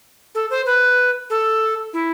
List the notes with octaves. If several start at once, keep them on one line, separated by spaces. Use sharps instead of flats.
A4
C5
B4
A4
E4